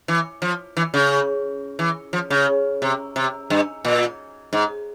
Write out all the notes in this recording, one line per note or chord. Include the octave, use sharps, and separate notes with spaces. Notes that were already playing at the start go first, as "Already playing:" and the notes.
E3
F3
E3
C#3
E3
F3
C#3
C3
C3
G2
A#2
G#2